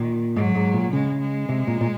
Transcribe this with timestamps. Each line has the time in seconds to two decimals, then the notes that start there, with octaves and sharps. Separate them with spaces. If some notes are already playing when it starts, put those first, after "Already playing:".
Already playing: A#2 D#3
0.36 G#2 F#3
0.55 G#2
0.74 A#2
0.93 C#3 G#3
1.21 G#3
1.49 C3
1.67 A#2
1.81 A#2